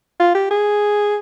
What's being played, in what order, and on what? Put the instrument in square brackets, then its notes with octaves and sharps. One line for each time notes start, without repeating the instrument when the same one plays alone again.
[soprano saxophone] F4
G4
G#4